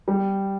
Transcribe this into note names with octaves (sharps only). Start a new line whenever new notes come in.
G3